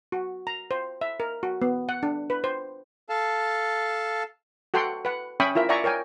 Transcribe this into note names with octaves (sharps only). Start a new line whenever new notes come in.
F#4
A#5
C5
E5
A#4
F#4
B3
F#5
D4
B4
C5
A4 F5 A5
F#4 A4 F#5 G5 C6
B4 F#5
C#4 E5 G5 B5 C#6 D#6
E4 F4 A#4 E5
D5 E5 F#5 G#5 A#5 C#6
A#4 C#5 G5 G#5